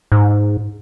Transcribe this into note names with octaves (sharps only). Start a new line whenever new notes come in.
G#2